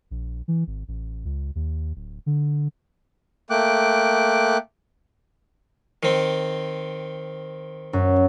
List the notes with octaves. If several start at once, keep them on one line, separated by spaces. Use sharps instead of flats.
A#1
E3
G#1
A1
C#2
D#2
D1
D3
A3 A#3 G5 D6 F#6
D#3 C4
F#2